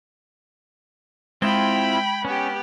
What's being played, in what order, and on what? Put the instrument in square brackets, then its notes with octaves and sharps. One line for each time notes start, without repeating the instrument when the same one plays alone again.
[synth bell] G#3 G#6 G7 [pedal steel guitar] C4 E4 F4 [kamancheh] G5 B5
[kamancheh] B3 G4 [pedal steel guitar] C#4